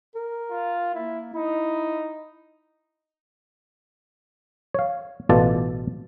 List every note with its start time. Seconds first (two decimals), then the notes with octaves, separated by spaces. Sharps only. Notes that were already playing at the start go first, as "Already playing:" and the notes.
0.15 A#4
0.51 F4
0.95 A#3 E4
1.33 D#4 E4
4.74 C#5 F5
5.29 A1 B2 F4 A4 D5 A5